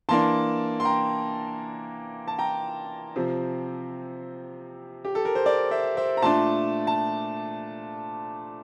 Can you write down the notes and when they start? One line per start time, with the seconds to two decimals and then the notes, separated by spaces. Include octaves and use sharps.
0.09 E3 A#3 D4 A5 C6
0.80 C6
0.85 G5 A#5
2.28 A5
2.39 G5 A#5
3.16 C3 F3 C4
5.05 G4
5.15 A4
5.25 A#4
5.35 C5
5.46 A#4 D5
5.71 C5 E5
5.97 C5 E5
6.17 A#5
6.22 A#2 A3 D4 A5 C6
6.87 A5